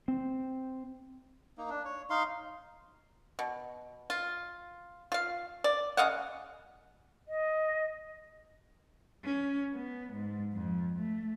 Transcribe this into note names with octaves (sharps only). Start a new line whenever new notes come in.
C4
A#3 D#4
D4
C#5
D#4 F5 C6
B2
F4
F4 F5
D5
C#3 D#5 F5 F#5
D#5
C#4
B3
G#2
F2
A3